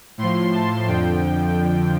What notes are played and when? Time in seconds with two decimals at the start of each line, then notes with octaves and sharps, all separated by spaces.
0.18 A2 F3 C6
0.53 A5
0.87 F2 D3 F3 G5